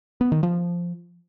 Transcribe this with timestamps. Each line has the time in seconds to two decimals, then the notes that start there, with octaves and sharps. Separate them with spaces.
0.21 B3
0.32 D#3
0.43 F3